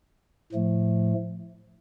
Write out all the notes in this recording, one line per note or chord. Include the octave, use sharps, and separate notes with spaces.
A2 F3 A3